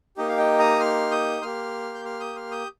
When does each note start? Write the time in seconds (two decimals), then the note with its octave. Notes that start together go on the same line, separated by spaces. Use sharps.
0.17 A#3 D#4 G4 D#5
0.28 F5
0.38 D#5 G5
0.59 A#5 D#6
0.80 C6 F6
1.11 D#6 G6
1.42 A#3 G4 C6 F6
1.95 G6
2.05 C6 F6
2.20 D#6 G6
2.36 C6 F6
2.51 D#6 G6